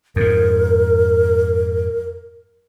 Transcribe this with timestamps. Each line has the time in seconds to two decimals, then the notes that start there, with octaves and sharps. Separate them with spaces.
0.16 F2 G#2 A#4